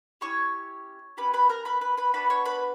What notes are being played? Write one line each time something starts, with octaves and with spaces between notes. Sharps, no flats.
C#4 E4 G4 C#5 C#6
C#4 G4 B4 B5
B4 B5
A#4 A#5
B4 B5
B4 B5
B4 B5
B3 D4 F#4 B4 B5
C#5 C#6
B4 B5